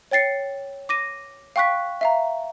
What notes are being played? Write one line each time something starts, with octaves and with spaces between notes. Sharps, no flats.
C#5 G5 A6 C7 C#7
D6 A#6 D#7
F5 G5 C#6 F#6 B6
E5 F5 A#5